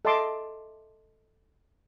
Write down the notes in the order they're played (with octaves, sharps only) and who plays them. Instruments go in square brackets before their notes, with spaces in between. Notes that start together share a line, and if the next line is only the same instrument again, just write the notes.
[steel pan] A4 D#5 E5 A5 C6 D6